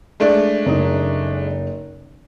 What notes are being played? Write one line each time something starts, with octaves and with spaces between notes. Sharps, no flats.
G#3 A3 D4
F#1 D#4